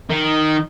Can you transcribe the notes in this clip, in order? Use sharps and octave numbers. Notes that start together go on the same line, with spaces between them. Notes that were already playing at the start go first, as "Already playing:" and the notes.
D#3